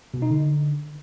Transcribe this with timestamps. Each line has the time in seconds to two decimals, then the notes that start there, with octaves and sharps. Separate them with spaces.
0.14 B2
0.22 D#4
0.31 D3